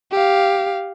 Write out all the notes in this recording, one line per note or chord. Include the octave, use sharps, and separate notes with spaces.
G4 F5